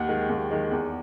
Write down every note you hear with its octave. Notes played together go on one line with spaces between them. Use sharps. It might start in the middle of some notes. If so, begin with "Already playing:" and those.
Already playing: D#2 F#5
D#3 G#3
D#2
D#3 G#3
E2